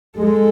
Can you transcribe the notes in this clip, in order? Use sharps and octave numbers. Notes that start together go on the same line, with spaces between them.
G#3 A4